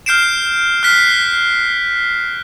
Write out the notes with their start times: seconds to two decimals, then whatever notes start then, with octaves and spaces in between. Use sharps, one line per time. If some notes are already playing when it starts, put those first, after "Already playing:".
0.06 F6 G6 C7 D7 E7
0.83 F6 F#6 B6 C7